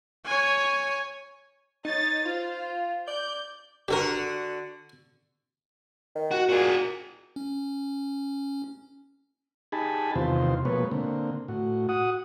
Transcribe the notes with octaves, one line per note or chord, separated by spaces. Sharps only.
C#5 G#5
D#4 C#5 A6
F4 C5
D5 G6
D3 F#4 G4 A4 A#4
D#3
F#4
A#2 F#4 G#4
C#4
D#4 G4 G#4 G#5 A5 B5
E2 C3 D#3 F4 C5
B2 F3 G#3 A#3 B4 C#5
D3 A#3 C4
A2 F#4
F#4 F#5 D#6